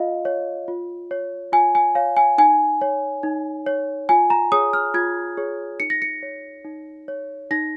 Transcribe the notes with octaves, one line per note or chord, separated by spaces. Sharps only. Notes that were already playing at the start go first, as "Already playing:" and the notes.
Already playing: F4 D#5 F5
C#5
F4
C#5
F4 G#5
G#5
C#5 F5
G#5
D#4 G#5
C#5
D#4
C#5
F4 G#5
A#5
G#4 C#5 D#6
F6
F4 G#6
G#4 C#5
D#4 C#7
A#6
C#7
C#5
D#4
C#5
D#4 A#6